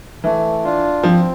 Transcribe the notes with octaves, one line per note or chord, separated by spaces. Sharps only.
E3 A3
D4 F4
F3 C4